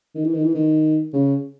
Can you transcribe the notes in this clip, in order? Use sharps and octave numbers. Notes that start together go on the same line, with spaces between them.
D#3
E3
D#3
E3
D#3
C#3